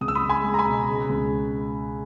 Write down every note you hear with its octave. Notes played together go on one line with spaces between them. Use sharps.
C#2 D#6
E6
B5 D#6
G#3
G#5 B5
G#3
A#5
G#5 B5
B2
C#3
C#2